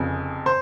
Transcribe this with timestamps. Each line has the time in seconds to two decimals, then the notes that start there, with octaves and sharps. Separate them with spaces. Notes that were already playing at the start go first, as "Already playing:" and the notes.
Already playing: F1 F2 C#3
0.46 C5